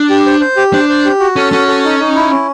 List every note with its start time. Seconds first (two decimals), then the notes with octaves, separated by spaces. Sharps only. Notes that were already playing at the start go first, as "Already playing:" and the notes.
Already playing: D4
0.10 G4
0.26 C5
0.41 C5
0.57 G4
0.73 D4 C5
0.89 C5
1.05 G4
1.20 F#4
1.36 C#4 A4
1.52 C#4 F#4
1.68 A4
1.84 D#4
1.99 D#4
2.15 E4
2.31 C#4